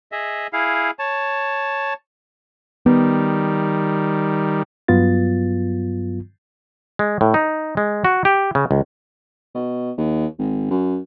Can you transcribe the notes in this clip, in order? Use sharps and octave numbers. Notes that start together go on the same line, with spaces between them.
G#4 D#5 E5
E4 G#4 F5
C#5 A5
D#3 G3 B3
G2 F#3 B3 F4 A6
G#3
A2
D#4
G#3
F#4
G4
C#3
C#2
B2
D#2
G#1
F#2